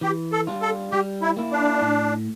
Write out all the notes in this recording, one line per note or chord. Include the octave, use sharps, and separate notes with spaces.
E3 G4
A4
G3 D4 F4
A4
G3 G4
E4
A#3 E4
D4
A2